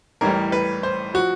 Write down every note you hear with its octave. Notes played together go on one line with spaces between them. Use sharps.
A1 A2 E3 G3 A#4
B4
C5
F3 F#4